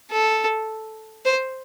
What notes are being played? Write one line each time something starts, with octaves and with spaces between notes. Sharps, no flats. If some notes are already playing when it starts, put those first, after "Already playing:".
A4
C5